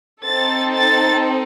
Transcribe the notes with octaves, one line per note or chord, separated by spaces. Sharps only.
C4 D#4 A4 A6
A6